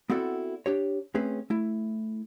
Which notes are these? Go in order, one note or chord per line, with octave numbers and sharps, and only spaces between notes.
B3 C4 E4 F#4 A4 D5
D4 G4 C#5
A3 C4 C#4 G#4 B4
A3 E4